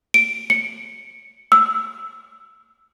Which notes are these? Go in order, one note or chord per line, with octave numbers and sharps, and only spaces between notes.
D7
C#7
E6